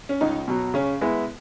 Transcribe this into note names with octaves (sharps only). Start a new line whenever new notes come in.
C#4
C#2 D#4
B2 F#3
C#3 C#4
G#3 B3 E4